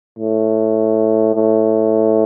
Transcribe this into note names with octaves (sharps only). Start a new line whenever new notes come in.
A2
A2